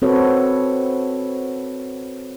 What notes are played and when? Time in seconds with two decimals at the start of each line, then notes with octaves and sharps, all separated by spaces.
0.02 C4 F#4 A4 B4 C#5